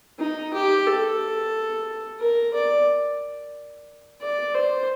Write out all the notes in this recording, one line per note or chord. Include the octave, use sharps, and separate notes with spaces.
D#4
G4
A4
A#4
D5
D5
C5